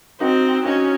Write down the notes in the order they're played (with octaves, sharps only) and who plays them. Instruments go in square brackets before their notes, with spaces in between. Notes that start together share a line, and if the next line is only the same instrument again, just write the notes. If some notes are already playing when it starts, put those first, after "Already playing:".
[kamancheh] C4 [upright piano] D#4 F#4
[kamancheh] C#4 [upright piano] D#4 F#4